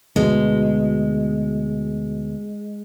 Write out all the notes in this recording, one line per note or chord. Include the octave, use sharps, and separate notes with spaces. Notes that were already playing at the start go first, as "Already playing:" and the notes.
D2 B2 G#3